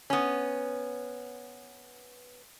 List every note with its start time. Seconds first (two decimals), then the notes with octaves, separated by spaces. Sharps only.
0.10 B3 C#4